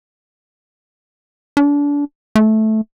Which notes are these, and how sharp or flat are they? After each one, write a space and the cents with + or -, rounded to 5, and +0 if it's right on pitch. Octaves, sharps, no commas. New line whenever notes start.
D4 -30
A3 -10